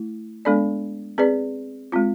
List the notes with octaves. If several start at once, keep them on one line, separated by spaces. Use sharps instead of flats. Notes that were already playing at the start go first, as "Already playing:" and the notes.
Already playing: A3 E4
G#3 B3 D4 A4 D5
C4 G#4 B4 D5
G#3 C4 F4